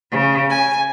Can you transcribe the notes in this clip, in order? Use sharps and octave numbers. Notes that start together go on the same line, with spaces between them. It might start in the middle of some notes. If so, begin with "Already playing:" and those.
C#3
G#5